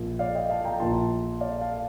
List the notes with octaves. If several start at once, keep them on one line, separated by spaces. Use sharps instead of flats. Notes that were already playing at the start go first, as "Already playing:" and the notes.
Already playing: A#1 A#2 F3
D5 F5
D#5 G5
F5 A5
G5 A#5
A#1 A#2 F3 A5 C6
D5 F5
F5 A5